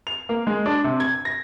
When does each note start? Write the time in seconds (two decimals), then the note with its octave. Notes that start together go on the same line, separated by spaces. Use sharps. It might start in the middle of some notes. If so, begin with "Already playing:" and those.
0.07 F7
0.29 A#3
0.47 G#3
0.66 D4
0.84 C3
1.00 G#6
1.25 A#6